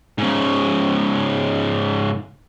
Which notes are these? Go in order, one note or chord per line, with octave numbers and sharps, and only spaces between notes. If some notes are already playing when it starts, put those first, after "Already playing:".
G#2 C#3